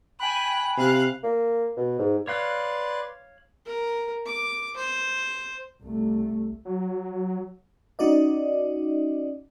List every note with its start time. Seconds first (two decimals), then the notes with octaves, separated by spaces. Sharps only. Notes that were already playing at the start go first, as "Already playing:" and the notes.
0.20 G5 G#5 B5 F#6
0.77 C3 F5 F#6
1.24 A#3
1.77 B2
1.99 G#2
2.27 B4 C#5 D5 F5 C6 F#6
3.66 A#4
4.26 D6
4.77 C5
5.83 C2 A3
6.65 F#3
7.99 C#4 D#4 F#4 D5 D#5